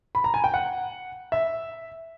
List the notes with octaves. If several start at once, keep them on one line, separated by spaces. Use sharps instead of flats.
B5
A#5
G#5
G5
F#5
E5